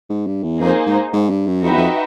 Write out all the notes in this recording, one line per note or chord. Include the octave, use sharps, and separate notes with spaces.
G#2
G2
E2
F2 A#3 D#4 G#4 C5
G#2
G#2
G2
F#2
F2 D#4 F#4 B4 E5 G5
E2
F2